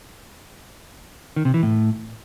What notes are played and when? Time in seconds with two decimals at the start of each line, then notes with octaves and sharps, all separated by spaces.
1.36 D#3
1.45 C3
1.54 E3
1.63 A2